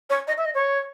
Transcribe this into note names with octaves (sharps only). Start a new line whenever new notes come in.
C#5
D#5
E5
D#5
C#5